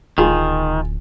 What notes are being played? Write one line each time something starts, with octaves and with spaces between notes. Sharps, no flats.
D1 D#3 F4 G#4 G#5